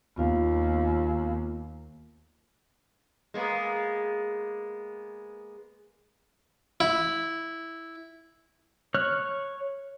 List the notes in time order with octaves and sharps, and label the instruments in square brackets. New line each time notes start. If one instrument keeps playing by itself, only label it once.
[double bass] D#2 [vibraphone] B3 F4 F5
[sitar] G#3 A#3 B3
[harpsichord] E4
[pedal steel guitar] C#5 F6 F#6